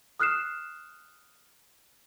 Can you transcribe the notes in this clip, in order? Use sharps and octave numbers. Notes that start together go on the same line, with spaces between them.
D#6 F6 F#6 C7 E7